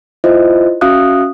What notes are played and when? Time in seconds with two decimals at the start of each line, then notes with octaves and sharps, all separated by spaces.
0.24 E4 F4 C5 D#5 E5
0.81 C#4 F#4 E5 F5 D#6 F#6